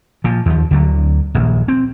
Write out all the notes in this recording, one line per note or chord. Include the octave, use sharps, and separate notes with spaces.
A#2 F3
D#2 F3
D2 D3 F#3
D#1 A#1
C4